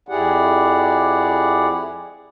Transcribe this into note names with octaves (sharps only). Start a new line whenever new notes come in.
F2 E4 G4 G#4 D5 F#5